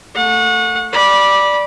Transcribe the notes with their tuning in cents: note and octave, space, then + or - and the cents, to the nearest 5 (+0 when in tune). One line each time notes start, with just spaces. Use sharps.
A3 +10 F#5 -30
D5 +0 B5 -20